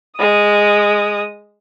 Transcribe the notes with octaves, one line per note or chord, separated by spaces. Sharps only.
G#3 D#6